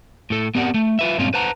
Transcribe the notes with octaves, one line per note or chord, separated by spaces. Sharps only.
A2 A4
B3 C4 G4 A#4 D5 F#5
A3
F4 B4 E5
G2 A#2 G#3 C4 C#4 F4
B4 C5 F#5 A5 A#5